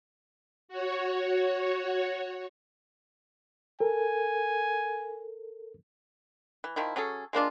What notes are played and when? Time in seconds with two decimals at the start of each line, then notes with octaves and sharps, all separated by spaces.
0.69 F#4 C#5
3.80 A4 A#4 G#5
6.64 E3
6.76 D#3 F3 E4
6.96 F#3 C#4 G#4 A4
7.33 G#3 A#3 D4 F4